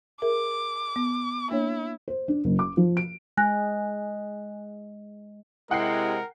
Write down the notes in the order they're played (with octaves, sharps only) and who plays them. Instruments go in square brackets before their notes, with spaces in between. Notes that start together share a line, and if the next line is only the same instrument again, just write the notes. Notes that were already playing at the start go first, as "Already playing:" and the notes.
[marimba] G#4 A#4 E5 [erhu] D6
[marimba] B3
[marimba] A#3 D4 C#5 [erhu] E4
[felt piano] C5
D4
F#1
D6
F3
D7
[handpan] G#3 [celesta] G#5 F#6 A#6
[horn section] C3 G#3 [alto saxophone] E4 [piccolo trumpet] A#4 [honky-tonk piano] F#5 G5 C7